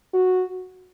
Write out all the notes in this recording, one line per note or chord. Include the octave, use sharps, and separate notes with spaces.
F#4